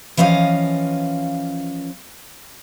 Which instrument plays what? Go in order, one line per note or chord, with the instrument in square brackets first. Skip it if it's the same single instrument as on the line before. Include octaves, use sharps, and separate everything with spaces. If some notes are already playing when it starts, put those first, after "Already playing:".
[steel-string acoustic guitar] E3 F3 C#4 D#5 F5